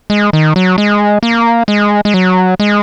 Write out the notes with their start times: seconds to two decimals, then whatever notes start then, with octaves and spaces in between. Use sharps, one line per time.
0.10 G#3
0.33 D#3
0.56 F#3
0.78 G#3
1.23 A#3
1.68 G#3
2.05 G#3
2.14 F#3
2.60 G#3